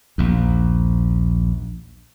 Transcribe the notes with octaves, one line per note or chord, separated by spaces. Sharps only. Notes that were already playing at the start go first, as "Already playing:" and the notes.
A#1 D#2